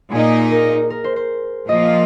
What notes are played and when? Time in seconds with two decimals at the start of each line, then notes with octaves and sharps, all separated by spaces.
0.11 A#2 A#3 D#4 G#4
0.51 A#4
0.90 A#4
1.04 C5
1.16 C5
1.69 A#2 F3 A#3 F4 D#5